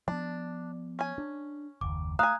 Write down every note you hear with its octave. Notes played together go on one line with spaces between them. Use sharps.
F3 B3 D4
C#4 G#5
D4
F#1 D#2 D6
A3 F5 G#5 A#5 D#6 F#6